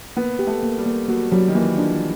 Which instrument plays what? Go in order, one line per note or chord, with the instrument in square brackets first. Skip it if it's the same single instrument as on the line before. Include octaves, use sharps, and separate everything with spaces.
[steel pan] A#3 [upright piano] B3
[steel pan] G4
[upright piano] A3
[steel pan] A#3
[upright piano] G3
[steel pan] A#3
[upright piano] F#3 [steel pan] A#3
[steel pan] F#3 [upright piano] G3
[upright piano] D#3
[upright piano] E3 [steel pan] A#3
[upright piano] F3 [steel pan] D4